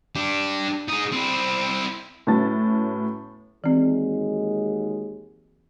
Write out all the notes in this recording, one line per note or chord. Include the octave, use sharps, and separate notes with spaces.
D4 G4
D#4 G#4
C4 E4
A2 F#3 B3 C#4 A5 A6
D#2 E3 F#3 G#3 C4